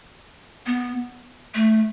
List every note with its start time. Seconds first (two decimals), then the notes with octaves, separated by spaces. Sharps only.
0.66 B3
1.55 A3